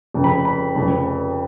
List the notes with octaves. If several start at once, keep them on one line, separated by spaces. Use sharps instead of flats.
F1 F2 C#3
B5
B5
F1 F2 C#3